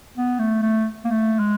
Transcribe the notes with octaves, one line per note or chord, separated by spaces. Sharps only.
B3
A3
A3
A#3
A3
G#3